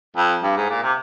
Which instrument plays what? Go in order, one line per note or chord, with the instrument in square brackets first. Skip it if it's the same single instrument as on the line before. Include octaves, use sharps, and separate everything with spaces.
[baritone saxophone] F2
G2
G#2
A#2
C3